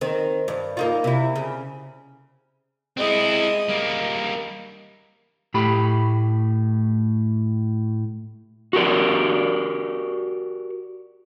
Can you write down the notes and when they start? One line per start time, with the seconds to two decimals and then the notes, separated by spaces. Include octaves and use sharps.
0.01 D#3 C4
0.48 G2
0.77 A#3 D#4 F4
1.04 C3 E4
1.36 C#3
2.97 G#3 C4 E4 D#5
3.69 G3 A#3
5.54 A2 A3 G4 B5
8.73 F#4 G4 A#4 D5